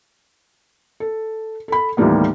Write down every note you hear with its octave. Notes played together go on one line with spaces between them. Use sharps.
A4
A4 B5
D#2 A2 E3 G3 A#3 B3